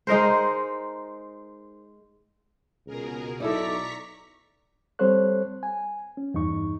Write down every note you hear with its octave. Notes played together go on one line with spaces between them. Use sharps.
G#3 D#4 A#4 C5
C#2 B2 G#4 A#4
B1 D#4 E4 A4 D5 A#5 C#6 B6
G3 C4 A4 C5 C#5 F#6
G#5
C#4
E2 G2 D#4 C#6